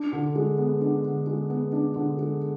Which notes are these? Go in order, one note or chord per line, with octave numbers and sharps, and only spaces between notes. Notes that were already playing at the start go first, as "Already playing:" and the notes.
Already playing: D4
D3
G#3
B3
D4
D3
G#3
B3
D4
D3
G#3